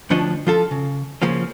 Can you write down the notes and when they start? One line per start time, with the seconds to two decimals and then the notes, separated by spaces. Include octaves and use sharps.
0.10 D2 F3 D4 C#5 D#5
0.47 F3 F4 A4
0.71 C#3
1.22 C#3 F3 A#3 C#4